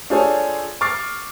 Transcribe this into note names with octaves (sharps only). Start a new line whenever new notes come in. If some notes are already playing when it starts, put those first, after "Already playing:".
D4 F4 G#4 A4 C5 C#5
C#6 D6 F6 A6 C7